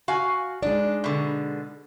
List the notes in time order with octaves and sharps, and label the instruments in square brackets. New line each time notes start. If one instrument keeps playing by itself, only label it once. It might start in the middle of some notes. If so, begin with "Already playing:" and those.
[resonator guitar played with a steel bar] F#4 F5 G#5
[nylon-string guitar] G#3 D#4 D5 [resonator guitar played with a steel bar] D4
[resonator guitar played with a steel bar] B2 D3